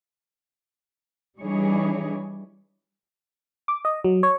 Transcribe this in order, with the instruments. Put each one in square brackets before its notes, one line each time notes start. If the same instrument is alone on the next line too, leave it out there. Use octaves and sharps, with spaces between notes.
[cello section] E3 G3 D4 D#4 G#4 C#5
[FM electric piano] D6
D#5
F#3
C#5